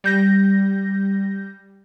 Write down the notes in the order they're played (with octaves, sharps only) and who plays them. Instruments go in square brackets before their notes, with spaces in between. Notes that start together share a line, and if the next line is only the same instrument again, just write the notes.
[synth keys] G3 G6 A#6